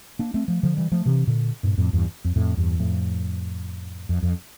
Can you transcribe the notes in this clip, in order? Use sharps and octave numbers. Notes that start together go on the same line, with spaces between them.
A#3 D4
A3 C4
F3 A3
D3 F3
E3 G3
F3 A3
C3 E3
A#2 D3
G2 A#2
F2 A2
E2 G2
F2
F2 A2
E2 G2
F2 A2
F2
F2